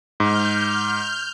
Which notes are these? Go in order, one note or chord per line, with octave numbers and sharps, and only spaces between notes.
G#2 F6 G6